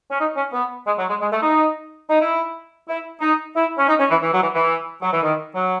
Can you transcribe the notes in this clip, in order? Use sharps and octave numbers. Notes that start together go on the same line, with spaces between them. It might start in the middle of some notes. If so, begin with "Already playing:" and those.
C#4
D#4
C#4
B3
G#3
F#3
G#3
G#3
A3
D#4
D#4
E4
E4
D#4
E4
C#4
D#4
C#4
E3
E3
F#3
E3
E3
F#3
E3
D#3
F#3